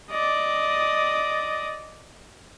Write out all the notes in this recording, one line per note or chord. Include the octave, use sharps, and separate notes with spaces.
D5 D#5